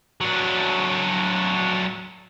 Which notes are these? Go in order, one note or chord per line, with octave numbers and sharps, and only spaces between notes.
F#3 D4